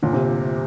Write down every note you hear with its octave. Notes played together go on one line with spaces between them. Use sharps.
G1 A#2
C3